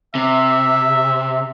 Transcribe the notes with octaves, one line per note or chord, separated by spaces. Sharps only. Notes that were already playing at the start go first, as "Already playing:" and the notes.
C3 E5